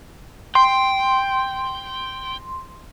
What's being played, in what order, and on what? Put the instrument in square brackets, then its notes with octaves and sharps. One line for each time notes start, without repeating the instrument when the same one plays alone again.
[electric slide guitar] G5 [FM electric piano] C6